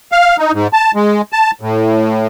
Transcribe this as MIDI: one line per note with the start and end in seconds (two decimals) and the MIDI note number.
0.12 0.37 77
0.38 0.52 63
0.53 0.67 44
0.73 0.91 81
0.95 1.22 56
1.33 1.51 81
1.61 2.27 45